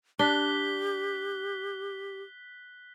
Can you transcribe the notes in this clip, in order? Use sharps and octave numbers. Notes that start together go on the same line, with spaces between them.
D4 G4 F#6 B6 G7